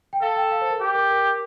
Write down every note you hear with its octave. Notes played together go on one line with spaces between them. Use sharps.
G5
A4 F5
G5
F5
C5
A#4
G4
A#4
A#4